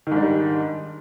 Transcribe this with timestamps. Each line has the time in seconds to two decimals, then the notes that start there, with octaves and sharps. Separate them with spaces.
0.07 D#3
0.11 G#2
0.16 D4
0.21 G3